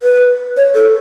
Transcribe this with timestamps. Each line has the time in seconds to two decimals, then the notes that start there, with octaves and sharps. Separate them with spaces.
0.03 B4
0.57 C#5
0.74 A4